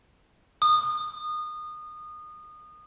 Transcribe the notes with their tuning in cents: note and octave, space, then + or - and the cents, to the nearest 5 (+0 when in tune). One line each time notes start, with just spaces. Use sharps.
D#6 -25